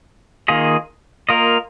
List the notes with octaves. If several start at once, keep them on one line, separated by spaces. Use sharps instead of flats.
D#3 A#3 F4 G#4 D#5
A#3 F4 A#4 D#5